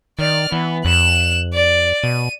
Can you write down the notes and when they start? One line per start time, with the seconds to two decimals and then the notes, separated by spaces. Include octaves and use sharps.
0.19 D#3 D5 F6
0.52 E3 B3
0.85 F2 F#6 E7
1.54 D5
2.04 B2 D#7